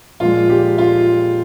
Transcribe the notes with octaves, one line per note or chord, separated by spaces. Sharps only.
A#2 F3 G#3 F4
G4
F4